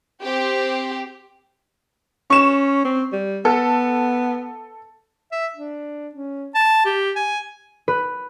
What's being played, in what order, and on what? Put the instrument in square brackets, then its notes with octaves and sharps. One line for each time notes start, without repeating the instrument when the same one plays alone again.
[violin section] C4 G4
[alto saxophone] C#4 [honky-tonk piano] C#6 E7
[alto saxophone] C4
G3
[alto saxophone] B3 [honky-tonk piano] A4
[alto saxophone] E5
D4
C#4
A5
G4
G#5
[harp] B4